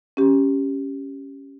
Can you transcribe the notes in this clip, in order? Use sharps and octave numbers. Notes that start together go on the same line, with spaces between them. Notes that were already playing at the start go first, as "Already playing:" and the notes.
C#4 G4